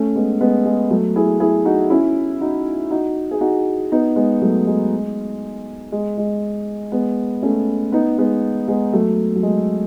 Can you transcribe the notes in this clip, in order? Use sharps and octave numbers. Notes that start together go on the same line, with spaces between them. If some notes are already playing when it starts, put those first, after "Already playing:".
Already playing: A3 C#4
G#3 B3
G#3 B3
G#3
F#3 A3
E4 G#4
E4 G#4
D#4 F#4
C#4 E4
D#4 F#4
D#4 F#4
G#4
D#4 F#4
B3 D#4
G#3 B3
F#3 A3
G#3
G#3
G#3
G#3 B3
A3 C#4
B3 D#4
G#3 B3
G#3 B3
F#3 A3
F#3
G#3